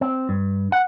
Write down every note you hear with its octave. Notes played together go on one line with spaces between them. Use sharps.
C4
G2
F#5